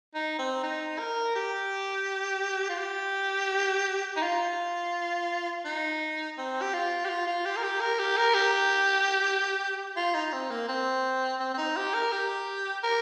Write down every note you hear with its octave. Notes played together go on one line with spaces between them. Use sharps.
D#4
C4
D#4
A#4
G4
F4
G4
D#4
F4
D#4
C4
G4
F4
G4
F4
F4
G4
A#4
G4
A#4
G4
A#4
G4
F4
D#4
C4
A#3
C4
C4
C4
D#4
G4
A#4
G4
A#4